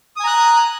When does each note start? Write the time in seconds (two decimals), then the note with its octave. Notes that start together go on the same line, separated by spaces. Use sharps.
0.16 D#6
0.20 G#5
0.24 A#5
0.27 F#6